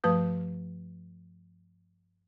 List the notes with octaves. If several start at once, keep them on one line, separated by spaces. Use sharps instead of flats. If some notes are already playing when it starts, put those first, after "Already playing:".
G2 F3 A3 B4 D#6 G6